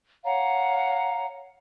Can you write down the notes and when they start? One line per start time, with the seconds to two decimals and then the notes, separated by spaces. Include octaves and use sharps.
0.24 C#5 F5 F#5 A#5